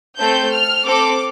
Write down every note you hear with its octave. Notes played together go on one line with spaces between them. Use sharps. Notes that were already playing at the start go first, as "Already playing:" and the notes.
A3 C4 A4 G6
F6
C4 A4 D6